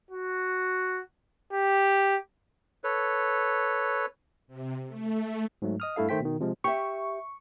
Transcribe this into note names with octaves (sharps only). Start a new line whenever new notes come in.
F#4
G4
A4 B4 C#5
C3
A3
G#2 F#3 A3
D#5 D#6 F6
G2 A3 E4 A4 F5
D#3 A3 C5 G5 B6
B2 D#3
C3 F3 G#3
G4 E5 C#6